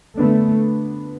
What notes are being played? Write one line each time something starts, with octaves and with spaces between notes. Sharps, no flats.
D3 A3 B3 D4